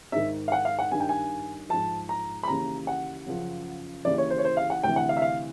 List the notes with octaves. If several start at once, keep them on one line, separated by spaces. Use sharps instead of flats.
G#2 D#3 E5
F5
F#5
F5
F#5
G2 D#3 G#5
G5
G#5
G#2 F3 A5
A#5
B5
D#2 C#3 E3 A#5
F#5
F#2 C#3 F3
D#2 C#3 E3 D5
C#5
C5
C#5
C5
F5
F#5
D2 C3 E3 G5
F#5
F5
E5
F5